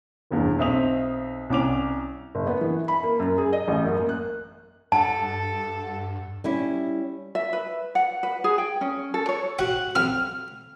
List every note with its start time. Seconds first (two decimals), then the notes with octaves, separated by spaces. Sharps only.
0.31 F1 E2 G2
0.59 B1 C4 E5 D#6 F7
1.50 C2 C#4 D6 F7
2.35 F#1
2.47 B3
2.61 E3
2.88 B5
3.03 A#3
3.20 F#2
3.38 G#4
3.53 D#5
3.68 A1
3.85 F#2
3.97 A#3
4.09 F#6
4.92 G2 A4 F#5 A5
6.44 G3 C#4 E4
7.35 E5
7.53 B4
7.95 F#5
8.23 B4
8.44 G#4
8.58 G5
8.81 C#4
9.14 A4
9.29 C#5
9.59 F#4 F#5 G5
9.95 F2 C4 F6